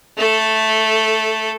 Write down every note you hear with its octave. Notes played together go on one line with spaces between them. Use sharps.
A3 A4